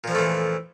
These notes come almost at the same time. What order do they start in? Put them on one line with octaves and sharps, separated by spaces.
A#2 F3 F2 A3 E3